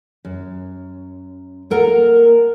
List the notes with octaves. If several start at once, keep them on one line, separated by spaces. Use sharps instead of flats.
F#2
A#3 A4 A#4 F#5 A#5